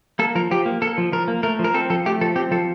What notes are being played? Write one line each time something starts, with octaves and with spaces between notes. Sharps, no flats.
A#3 A4
F3 A#4
F3 G4
A#3
A#3 A4
F3
F3 A#4
A#3
A3 A#4
F3
A#4
C4 A4
F3 A4
A3 G4
F3 A4
C4 G4
F3 A4